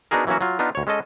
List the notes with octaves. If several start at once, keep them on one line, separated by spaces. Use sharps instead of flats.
B3 D4 D#4 F#4 G#4 A#4
E3 F#3 A#3 C#4 F#4
F#3 F4
B3 D4 D#4 F4
D2 C#5
G#3 C#4 A4 D#5